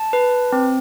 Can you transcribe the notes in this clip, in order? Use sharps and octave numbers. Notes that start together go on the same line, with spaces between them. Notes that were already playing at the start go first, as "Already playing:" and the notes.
Already playing: A5
B4
C4